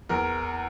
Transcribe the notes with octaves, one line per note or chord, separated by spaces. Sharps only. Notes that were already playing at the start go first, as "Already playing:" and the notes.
E2 A#4